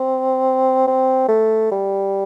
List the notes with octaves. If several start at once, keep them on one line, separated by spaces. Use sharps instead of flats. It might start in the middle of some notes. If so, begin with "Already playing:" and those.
Already playing: C4
C4
A3
G3